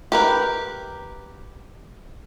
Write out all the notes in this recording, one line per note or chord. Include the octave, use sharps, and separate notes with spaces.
G4 A#4 B4